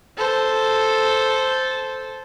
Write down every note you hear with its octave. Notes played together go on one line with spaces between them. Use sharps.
A4 C5